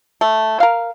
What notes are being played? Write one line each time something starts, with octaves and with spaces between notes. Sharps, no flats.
A3
A#4 F5